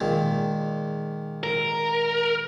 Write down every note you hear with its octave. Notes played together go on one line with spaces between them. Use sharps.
A#2 D#3 G#3
A#4